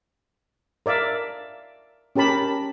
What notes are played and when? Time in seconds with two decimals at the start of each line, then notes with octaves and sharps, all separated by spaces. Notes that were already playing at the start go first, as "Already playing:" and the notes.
0.86 A#4 D5 E5 F5
2.16 C#4 G4 A#4 A5 B5